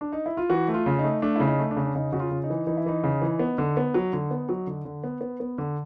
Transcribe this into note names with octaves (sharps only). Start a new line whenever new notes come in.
D4
D#4
E4
F4
E3 F#4
A3
F4
C#3
D#4
A3
A3 D4
C#3 E4
D#4
A3
D4
C#3
D4
C#3 D#4
C#3 F#4
F4
C#3
D#4
E3
E3 D#4
E4
E3 D#4
C#3
E3
B3
D3
B3
F#3
D3
B3
F#3
D3
D3
B3
B3
B3
D3